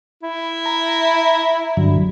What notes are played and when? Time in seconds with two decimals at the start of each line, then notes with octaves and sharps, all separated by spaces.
0.23 E4
0.66 A#5
1.77 G2 D3 F#3